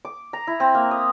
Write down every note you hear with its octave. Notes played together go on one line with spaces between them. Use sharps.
D6
A#5
E4
C4
A#3
D#6